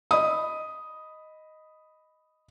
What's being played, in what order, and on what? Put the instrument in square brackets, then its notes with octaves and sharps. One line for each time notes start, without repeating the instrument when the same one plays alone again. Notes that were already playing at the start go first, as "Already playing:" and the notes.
[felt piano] D#5 B5 D#6